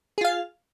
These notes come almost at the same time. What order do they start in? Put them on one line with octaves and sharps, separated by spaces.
G#4 F4 F5